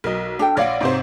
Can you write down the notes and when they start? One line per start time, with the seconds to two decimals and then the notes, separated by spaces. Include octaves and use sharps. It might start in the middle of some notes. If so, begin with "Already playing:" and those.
0.04 B1 A#4 D#5
0.39 D4 A4 G5
0.57 A#1 C#5 D5 F5 F#5
0.81 G#2 C3 C5